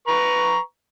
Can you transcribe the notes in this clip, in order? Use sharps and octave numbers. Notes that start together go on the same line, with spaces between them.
B4 A#5 C#6